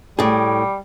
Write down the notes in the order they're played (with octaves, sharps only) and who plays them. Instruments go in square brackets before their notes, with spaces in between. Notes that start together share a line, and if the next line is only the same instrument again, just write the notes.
[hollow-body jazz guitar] A2 G#4 [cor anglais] G3